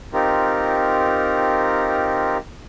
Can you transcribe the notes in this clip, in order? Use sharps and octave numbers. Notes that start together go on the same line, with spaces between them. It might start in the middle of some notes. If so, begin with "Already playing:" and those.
C4 D#4 F4 G4 A#4